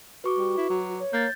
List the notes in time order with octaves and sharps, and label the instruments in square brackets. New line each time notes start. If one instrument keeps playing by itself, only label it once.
[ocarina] F#4 [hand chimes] B4 C#6 D6
[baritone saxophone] G3
E4
F#3
[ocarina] C#5
[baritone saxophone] A#3 [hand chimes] G6 A6